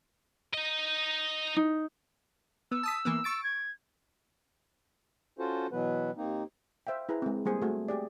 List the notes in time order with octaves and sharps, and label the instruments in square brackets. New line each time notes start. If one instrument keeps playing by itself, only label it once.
[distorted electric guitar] D#4 D#5
[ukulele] D#4
[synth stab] B3 [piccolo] E6
[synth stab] A5 D#6 B6
E3 A#3 B3
C#6 A6 D7
[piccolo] G#6
[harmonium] C#4 F4 F#4 A4 C5
B2 E3 F#3 B3 B4
D#2 A#3 C4 D#4
[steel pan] C5 E5 F5 G5
E4 G#4 B4 A#5
G#3 C4
G3 A#3 G#4 C5
A3 F#4 G#4
G4 G#4 D5